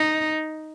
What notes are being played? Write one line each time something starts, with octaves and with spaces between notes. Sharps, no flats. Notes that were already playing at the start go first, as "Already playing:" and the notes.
Already playing: D#4